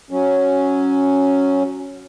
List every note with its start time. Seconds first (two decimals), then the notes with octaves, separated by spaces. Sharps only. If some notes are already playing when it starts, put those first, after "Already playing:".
0.11 F#3 C#4